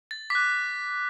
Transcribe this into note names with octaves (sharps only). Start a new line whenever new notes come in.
A6
D6 F#6 B6